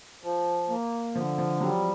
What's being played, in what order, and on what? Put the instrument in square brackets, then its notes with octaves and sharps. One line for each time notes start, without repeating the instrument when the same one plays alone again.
[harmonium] F3
A#3
[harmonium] D3 [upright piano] F3
[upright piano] F3
[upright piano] F#3 [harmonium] G3